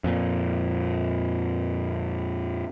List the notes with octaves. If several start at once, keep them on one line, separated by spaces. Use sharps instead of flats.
F2 A#2